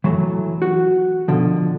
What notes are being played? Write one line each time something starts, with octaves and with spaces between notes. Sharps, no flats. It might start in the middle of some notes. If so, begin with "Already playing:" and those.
E3 F#3 A3
F#4
B2 D3 F3